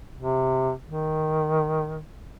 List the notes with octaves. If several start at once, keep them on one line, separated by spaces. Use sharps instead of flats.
C3
D#3